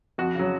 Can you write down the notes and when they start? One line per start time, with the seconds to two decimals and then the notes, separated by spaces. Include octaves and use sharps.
0.18 F2 F#4
0.35 C#3 F#3